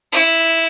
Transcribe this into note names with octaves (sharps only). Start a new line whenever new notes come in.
E4